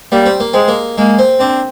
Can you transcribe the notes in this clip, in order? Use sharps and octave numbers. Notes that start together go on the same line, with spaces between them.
G3 A#3
C4
A#3
G#3 C4
A#3
G#3 A#3
C4
C4 D4